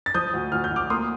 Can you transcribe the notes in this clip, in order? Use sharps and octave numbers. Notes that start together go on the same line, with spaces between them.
A6
F3 D#6 G6
D2
D2 F6
G6
D2 D6 F6
A#3 C6 D#6